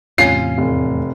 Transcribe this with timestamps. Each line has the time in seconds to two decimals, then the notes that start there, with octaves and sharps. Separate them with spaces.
0.18 E2 A2 C3 C#4 F4 C7
0.58 F1